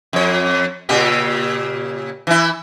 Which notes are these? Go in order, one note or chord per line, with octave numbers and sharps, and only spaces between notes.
F2 C#5
A#2 C#3 G4
E3 E4